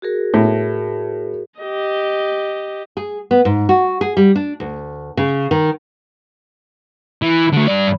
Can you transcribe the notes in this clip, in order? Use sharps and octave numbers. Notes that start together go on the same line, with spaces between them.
F#4 G#4 A#4
A2
G4 D#5
G#4
B3
G#2
F#4
G#4
G3
D4
D2
C#3
D#3
E3
D3 A3
G2 D5